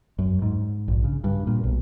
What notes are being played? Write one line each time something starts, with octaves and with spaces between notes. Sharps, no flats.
F#2
G#2
A#1
C#3
G2
A#2
B1